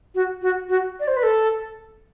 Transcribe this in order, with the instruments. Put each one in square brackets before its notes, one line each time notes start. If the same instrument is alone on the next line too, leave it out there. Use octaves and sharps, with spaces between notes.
[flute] F#4
F#4
F#4
D5
C5
B4
A4